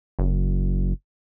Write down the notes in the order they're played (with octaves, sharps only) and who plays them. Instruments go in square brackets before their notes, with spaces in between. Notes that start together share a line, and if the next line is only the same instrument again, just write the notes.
[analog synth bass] F#1